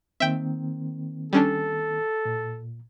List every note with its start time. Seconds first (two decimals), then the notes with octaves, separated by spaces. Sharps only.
0.20 D#3 A#3 C4 E5 G5
1.33 G3 C#4 D4 A4
2.25 A#2